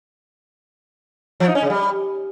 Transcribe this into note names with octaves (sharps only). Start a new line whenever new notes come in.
F3
D#4
C#4
C#3
G3